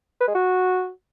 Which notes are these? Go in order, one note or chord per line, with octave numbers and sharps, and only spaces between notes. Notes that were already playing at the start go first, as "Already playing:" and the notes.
B4
G#3
F#4